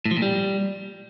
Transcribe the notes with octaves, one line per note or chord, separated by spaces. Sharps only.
A2
F3
A#2
G3